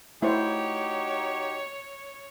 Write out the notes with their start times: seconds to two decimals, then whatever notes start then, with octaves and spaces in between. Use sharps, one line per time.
0.22 A3 D#4 E4 F#4 G4 C5 C#5